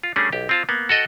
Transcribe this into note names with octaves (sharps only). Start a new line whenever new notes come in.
F4
G3 A3 C#4 D4 G#4
B1 G4
C4 F4 A5
A#3 B3
F#4 A4 D#5 F#5 G5